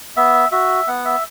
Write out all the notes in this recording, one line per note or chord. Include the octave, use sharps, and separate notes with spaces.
B3 E5
F#4 E5
B3 F#5
E5